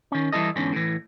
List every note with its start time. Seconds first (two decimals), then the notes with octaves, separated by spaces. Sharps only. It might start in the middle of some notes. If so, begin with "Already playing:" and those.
0.12 D#3 C#4
0.32 E3 G3 E4 A4 D#5
0.56 E2 G#2 D3 C#4
0.73 A2 E3